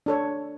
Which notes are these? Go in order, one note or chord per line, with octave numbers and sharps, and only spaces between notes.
D4 A4 C#5